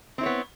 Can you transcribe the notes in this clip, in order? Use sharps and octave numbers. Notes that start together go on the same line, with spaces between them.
B3 C4 E4 C#5